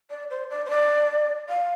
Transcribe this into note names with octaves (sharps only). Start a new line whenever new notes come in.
D5
C5
D5
C5
D5
F5